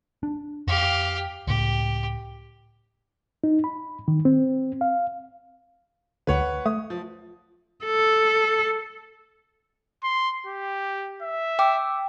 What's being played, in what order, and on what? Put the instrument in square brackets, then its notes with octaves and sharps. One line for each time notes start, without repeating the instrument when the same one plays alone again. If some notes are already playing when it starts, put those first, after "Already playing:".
[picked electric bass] D4
[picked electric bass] F2 [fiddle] G4 F5
[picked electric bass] C#2 A2 [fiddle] G4
[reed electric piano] D#4
B5
D#3
C4
F5
[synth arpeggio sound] D2 D3 [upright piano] B4 C#5 F#5
[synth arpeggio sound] A3 [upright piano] D#6
[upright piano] F3
[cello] A4
[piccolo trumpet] C6
G4
E5
[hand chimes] G5 D6 E6